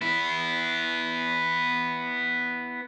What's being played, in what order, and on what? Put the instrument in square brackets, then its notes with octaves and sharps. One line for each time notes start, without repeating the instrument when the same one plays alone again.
[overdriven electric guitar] B3 E4